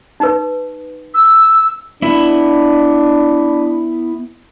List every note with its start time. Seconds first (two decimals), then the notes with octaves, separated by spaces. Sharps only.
0.20 D#4 B4
1.14 E6
2.02 B3 D4 E4